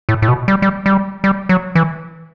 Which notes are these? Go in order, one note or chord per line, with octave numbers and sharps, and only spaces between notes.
A2
A2
B2
G3
G3
G3
G3
F#3
E3